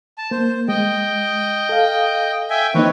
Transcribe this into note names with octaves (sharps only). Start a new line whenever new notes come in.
A5
A#3 C5
G#3 D#5 G5
A4 F5
E5 G5 G#5
E3 A#3 C4 D#4 B4 C#5